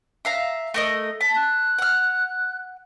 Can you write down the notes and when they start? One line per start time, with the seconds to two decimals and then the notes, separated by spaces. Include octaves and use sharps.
0.25 E5 F5 A#5
0.74 A3 A#4 D#5
1.21 A5 B6
1.36 F#6
1.78 F#5 F6